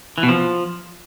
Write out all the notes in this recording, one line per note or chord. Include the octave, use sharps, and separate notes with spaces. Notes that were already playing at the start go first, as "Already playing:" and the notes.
E3
B2
F3